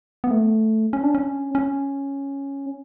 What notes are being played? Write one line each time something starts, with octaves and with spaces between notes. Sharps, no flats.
B3
A3
C#4
D4
C#4
C#4